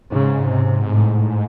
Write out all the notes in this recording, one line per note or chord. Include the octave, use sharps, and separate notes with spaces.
G#2 C#3
C3
A2